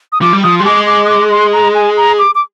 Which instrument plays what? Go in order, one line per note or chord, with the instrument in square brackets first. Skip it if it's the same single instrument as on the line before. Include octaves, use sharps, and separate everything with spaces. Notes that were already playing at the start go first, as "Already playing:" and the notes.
[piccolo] D#6
[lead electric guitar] F3 [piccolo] D6
[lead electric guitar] G3
[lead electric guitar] F3 [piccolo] D#6
[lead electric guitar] G3 [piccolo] C6
[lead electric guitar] G#3 [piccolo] D6
[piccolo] D6
D#6
D6
C6
A#5
G#5
A#5
D6
D6